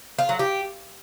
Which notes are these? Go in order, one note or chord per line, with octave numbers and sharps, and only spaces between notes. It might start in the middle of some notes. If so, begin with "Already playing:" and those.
F4
F#3
G4